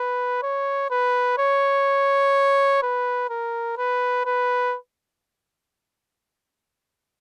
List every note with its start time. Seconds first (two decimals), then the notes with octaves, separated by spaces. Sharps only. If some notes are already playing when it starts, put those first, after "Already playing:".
Already playing: B4
0.43 C#5
0.91 B4
1.38 C#5
2.83 B4
3.30 A#4
3.78 B4
4.26 B4